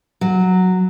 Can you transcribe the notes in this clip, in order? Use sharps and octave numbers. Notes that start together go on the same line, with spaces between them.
F#3